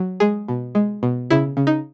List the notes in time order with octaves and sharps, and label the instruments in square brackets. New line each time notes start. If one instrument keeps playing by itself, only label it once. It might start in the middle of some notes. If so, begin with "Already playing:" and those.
Already playing: [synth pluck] F#3
G#3 G#4
B2
G#3
B2
C#3 E4
C#3
D#4